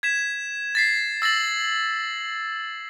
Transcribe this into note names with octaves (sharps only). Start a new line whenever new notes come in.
G#6 B6 E7
A6 B6 C7
E6 A6 A#6 F#7